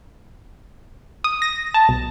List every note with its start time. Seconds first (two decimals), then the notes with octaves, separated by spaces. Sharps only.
1.24 D#6
1.42 A#6
1.74 A5
1.89 B1